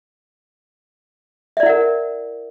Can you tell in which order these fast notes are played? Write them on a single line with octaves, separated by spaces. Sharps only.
E5 D5 E4 F#5 A#4